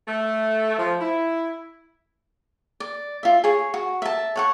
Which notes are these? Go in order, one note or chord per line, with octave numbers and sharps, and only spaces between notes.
A3
F3
E4
D5
F4 E5
G#4 C#5
F#4
E5 A5
C#5 F#5 C#6